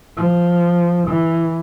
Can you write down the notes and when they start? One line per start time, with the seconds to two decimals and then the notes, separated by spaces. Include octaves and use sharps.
0.17 F3
1.08 E3